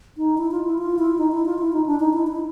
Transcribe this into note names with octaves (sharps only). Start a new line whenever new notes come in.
D#4
E4
F4
E4
F4
E4
D#4
E4
F4
E4
D#4
D4
D#4
E4
E4